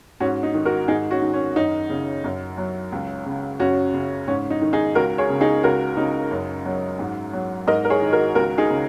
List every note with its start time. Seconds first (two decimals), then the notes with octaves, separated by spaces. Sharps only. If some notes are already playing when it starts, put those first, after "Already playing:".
0.20 G#2 C#4 F#4
0.43 D#4
0.54 D#3
0.65 F#4 A#4
0.88 G#2 D#4 G#4
1.11 C#4 F#4
1.22 D#3
1.33 C#4
1.56 F#2 D#4
1.90 C#3
2.24 F#2
2.58 F#3
2.92 C#2
3.26 C#3
3.59 F#2 C#4 F#4
3.94 C#3
4.28 G#2 C#4
4.50 D#4
4.61 D#3
4.73 D#4 G#4
4.95 C#2 F#4 A#4
5.18 G#4 C#5
5.29 C#3
5.40 D#4 G#4
5.63 C#2 F#4 A#4
5.97 C#3 D#4
6.31 F#2
6.65 F#3
6.99 G#2
7.33 F#3
7.67 G#2 A#4 D#5
7.85 A#4
7.90 G#4 C#5
8.01 D#3
8.13 F#4 A#4
8.35 C#2 F#4 A#4
8.58 D#4 G#4
8.70 C#3